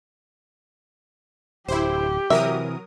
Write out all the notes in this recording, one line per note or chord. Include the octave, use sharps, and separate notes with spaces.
D1 E4 G4 C5
C3 E3 F#3 A#4 E5 D#6